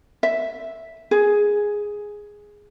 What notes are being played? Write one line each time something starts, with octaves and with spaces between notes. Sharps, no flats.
E5
G#4